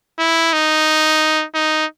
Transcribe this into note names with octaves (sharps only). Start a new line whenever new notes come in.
E4
D#4
D#4